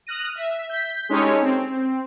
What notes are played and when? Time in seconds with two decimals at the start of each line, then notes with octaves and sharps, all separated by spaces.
0.07 D#6 F6 F#6 A#6 D#7
0.36 E5
0.69 G6 B6
1.09 G#3 C#4 D#4 G4 A4 C#5
1.42 C4